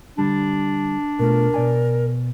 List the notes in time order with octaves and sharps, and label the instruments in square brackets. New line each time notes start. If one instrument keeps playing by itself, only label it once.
[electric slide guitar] D3 G3 [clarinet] D4
[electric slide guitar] B2 A3 F4 [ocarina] A#4
[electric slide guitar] B2 D5 G#5